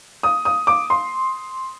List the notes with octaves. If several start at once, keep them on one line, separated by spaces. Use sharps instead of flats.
D#6
D#6
D6
C6